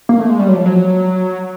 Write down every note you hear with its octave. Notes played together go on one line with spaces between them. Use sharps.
A#3
A3
G#3
G3
F#3
F3
F#3